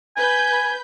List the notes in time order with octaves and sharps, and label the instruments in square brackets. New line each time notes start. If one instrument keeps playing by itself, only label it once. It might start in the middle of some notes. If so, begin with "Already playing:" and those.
[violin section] B4 G6 [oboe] G#5